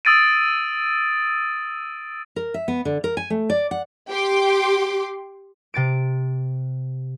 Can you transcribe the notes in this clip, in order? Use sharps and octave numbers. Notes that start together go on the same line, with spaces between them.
D#6 E6 A6 D7 D#7
A#4
E5
B3
D3
A#4
G#5
A3
D5
F#5
G4 G5 C6 D6
C3 A6 D7